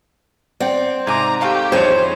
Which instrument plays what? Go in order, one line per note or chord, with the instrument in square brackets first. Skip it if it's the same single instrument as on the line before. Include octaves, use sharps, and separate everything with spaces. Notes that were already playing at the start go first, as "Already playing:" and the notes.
[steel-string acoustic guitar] C4 [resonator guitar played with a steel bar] D5 F#5 G5
[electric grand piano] G#2 D6 [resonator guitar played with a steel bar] C3 G#5 [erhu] A#5
[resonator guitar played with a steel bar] A3 F5 A5 [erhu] G4
[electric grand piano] F2 C#5 [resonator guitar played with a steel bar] E3 D#4 G#4 [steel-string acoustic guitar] C5